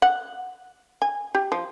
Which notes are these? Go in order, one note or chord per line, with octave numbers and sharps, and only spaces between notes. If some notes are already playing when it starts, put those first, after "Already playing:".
F#5
G#5
G4
F3